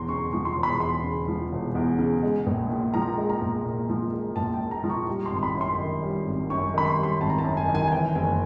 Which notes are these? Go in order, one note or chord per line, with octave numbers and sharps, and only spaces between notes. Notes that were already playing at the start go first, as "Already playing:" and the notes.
Already playing: E1 E2 A#5 C6
C#3 C#6
F3 C#6
C6
E1
B5
E2 C6
C#3
F3
E1
E2
C#3
G#3
A#1
A#2
F3 A#5
G#3
A#5
A#1
A#2
F3
G#3
A#1 A5
G5
A#2
A#5
F3
C#6
G3
C6
G#1
C6
B5
F#2
C6
D#3
G3
G#1
F#2 C#6
D#3 B5
C6
G3
C6
G#1 A5
A#5
A5
F#2
G#5
D#3
G#5
G#5
E3 G5
F#1 G#5